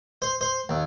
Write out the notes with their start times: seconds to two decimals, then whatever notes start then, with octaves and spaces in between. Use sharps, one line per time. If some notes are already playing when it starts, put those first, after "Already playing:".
0.22 C5
0.41 C5
0.69 D#2